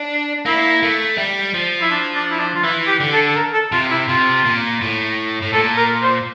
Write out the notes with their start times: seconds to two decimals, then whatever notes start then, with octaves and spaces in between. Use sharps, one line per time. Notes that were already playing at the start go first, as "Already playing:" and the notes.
Already playing: D4
0.46 A#3 E4
0.83 A3
1.18 G3
1.54 F3
1.82 E4
1.91 D4
2.15 D4
2.31 E4
2.39 D4
2.54 F4
2.63 E3 E4
2.87 G4
3.00 D3
3.12 A4
3.28 A4
3.36 A#4
3.53 A4
3.72 C3 F4
3.90 E4
4.09 C3 F4
4.45 A#2
4.81 A2
5.42 A2
5.53 A#2 A4
5.77 A#4
6.02 C5